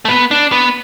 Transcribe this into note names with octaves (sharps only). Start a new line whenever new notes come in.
A3
B3
D4
B3